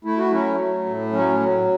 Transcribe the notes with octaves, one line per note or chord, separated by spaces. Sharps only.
A3 E4
F#4
F#3 C#4 E4
A3
A2
F#3 C#4
F#3